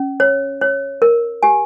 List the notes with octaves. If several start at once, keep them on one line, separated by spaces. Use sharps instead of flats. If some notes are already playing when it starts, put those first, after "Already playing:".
Already playing: C#4
C#5
C#5
A#4
G4 G#5